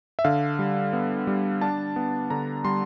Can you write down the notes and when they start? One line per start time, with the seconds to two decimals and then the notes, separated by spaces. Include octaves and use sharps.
0.19 E5
0.25 D3 F5
0.59 G3
0.93 B3
1.27 G3
1.61 D4 A5
1.96 B3
2.30 D3 A#5
2.65 G3 C6